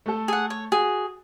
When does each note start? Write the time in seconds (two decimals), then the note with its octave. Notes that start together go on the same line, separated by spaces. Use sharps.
0.06 A3 A4
0.28 G#4 F#5
0.50 C#5
0.72 F#4 G#4